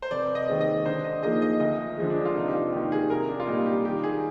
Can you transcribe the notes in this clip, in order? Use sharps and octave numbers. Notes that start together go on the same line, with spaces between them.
C5
F1 D5
D#5
D#2 D#3 G#3 C4
D#5
D3 C5
D#5
F3 A#3 D#4 G#4 D#5
D#5
D2 D#5
D3 F3 G#3
D4
F4
F1 D#4
G4
F4
D#2 D#3 G4
G#4
C2 A#4
D4
F4
A#2 G3 D#4
G4
D#3 G4
G#4